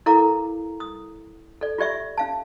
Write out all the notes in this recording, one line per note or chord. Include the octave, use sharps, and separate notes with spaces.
E4 A4 A#4 F5 A#5 D6
D#6
A4 D5
F4 G4 D5 E5 C#6
C#4 F5 A5